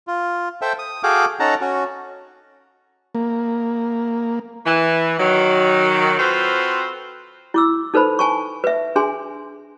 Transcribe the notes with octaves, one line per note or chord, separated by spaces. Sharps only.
F4
A4 C5 E5 G5
D#6
F#4 G#4 A4 F5 G5 D6
C#4 D#4 A4 F#5 A5 A#5
C#4 F#4
A#3
E3
D#3 F#3
C4 F4 F#4 A4 B4 C5
E4 D6 E6
D#4 A4 B4 C5 B5
G#5 A5 C#6
B4 E5
D4 G#4 G#5 C6